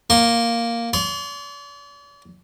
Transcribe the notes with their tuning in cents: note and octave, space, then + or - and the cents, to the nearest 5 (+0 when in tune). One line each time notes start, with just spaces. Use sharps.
A#3 +0 C6 +35
D5 -45 C6 +0